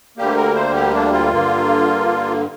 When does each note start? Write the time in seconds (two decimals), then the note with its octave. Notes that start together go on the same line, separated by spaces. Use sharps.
0.17 D2 D3 G3 A#3 G4
0.36 A#4
0.55 C5
0.75 G4
0.94 D4
1.13 F4
1.32 G2 D3 A#3